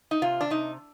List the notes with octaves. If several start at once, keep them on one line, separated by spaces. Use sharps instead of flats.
D#4
C3 F4
D4
C3 D#4